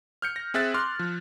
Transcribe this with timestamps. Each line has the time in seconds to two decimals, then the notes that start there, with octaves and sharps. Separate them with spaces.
0.22 F6 G6 C#7
0.36 A#6
0.54 C4 G#4 E5 F#6 A6
0.74 C6 D6 F6
0.99 F3